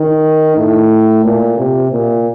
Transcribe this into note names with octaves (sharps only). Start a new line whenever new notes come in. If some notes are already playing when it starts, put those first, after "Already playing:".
Already playing: D#3
A2
A#2
C3
A#2